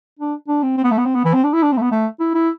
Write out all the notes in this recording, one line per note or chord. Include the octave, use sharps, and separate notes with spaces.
D4
D4
C4
C4
B3
A3
B3
C4
B3
E3
C4
D4
E4
D4
C4
A3
B3
A3
E4
E4